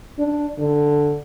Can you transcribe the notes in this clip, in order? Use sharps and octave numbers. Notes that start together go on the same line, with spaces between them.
D4
D3